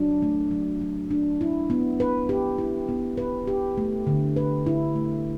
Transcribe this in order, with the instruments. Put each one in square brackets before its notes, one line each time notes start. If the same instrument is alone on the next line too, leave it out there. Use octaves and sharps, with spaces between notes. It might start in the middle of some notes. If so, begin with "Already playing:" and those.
Already playing: [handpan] F#3 D4
A3
F#3
F#3
D4
E4
B3
B4
G4
E4
B3
B4
G4
A3
D3
B4
E4
A3